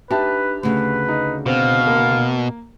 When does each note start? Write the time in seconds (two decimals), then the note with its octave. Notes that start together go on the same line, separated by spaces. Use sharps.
0.11 D4 D#4 G4 B4 E5 A5
0.63 D2 C#3 B4
1.08 D#4
1.46 B2 C4 F5
1.87 A#3